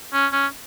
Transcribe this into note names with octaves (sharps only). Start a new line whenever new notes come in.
C#4
C#4